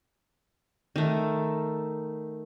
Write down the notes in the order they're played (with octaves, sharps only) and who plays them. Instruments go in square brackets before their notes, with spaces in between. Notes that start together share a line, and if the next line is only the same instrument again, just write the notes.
[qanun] D#3 A3